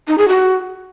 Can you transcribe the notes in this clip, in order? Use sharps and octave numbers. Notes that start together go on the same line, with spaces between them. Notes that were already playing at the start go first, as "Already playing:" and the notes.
D#4
G#4
F#4